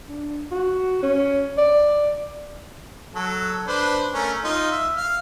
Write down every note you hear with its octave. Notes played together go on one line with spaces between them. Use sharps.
D4
F#4
C#4
D5
F#3 A4
D4 B4 C5
A3 C#4 A#4
D#4 F4
E5
F5